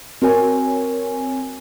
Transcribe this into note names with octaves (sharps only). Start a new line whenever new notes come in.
C4 F#4 A#4 C#5 G#5